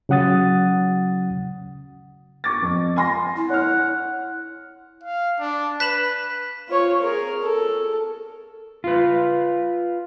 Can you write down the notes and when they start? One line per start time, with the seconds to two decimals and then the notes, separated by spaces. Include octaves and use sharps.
0.09 C#3 F#3 F#5 D#6 A6
2.44 C#6 D6 A6
2.62 F2
2.96 G#5 C6 A#6
3.36 E4
3.50 C#5 F#5 F6
5.03 F5
5.39 D4
5.80 B4 F#6 B6 E7 F#7
6.69 F4 C#5
7.02 G#4 A#4
7.42 A4
8.84 F4 B4